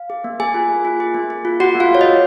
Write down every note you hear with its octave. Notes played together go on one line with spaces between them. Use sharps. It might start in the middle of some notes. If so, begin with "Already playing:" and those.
Already playing: F5
G#4
A#3
A#3 G#4 G#5
F4
A#3
F4
G#4
A#3
G#4
F4
F#4 G#4 F#5
A#3
F4 F5
A#3 C#5
G#4 D#5